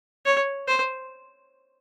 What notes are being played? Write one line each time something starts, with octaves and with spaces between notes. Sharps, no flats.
C#5
C5